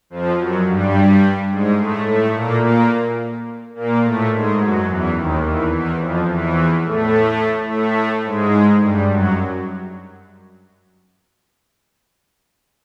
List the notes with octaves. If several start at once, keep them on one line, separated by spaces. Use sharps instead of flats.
F2 F3
F#2 F#3
G2 G3
G#2 G#3
A2 A3
A2 A3
A#2 A#3
A#2 A#3
A#2 A#3
A2 A3
G#2 G#3
F#2 F#3
E2 E3
D#2 D#3
E2 E3
E2 E3
F2 F3
E2 E3
A2 A3
A2 A3
G#2 G#3
G2 G3
F#2 F#3